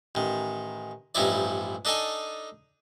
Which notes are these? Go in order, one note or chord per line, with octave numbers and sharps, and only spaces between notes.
A1 D#3
A1 G2 F3 D#4 E4 D5
D4 D#4 A4 D#5 G#5 A5